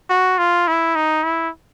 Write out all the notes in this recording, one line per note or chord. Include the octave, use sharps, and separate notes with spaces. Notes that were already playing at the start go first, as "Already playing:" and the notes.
F#4
F4
E4
D#4
E4